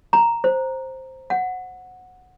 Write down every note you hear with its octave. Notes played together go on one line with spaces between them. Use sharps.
A#5
C5
F#5